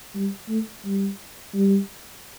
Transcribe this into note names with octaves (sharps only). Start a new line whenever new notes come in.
G3
A3
G3
G3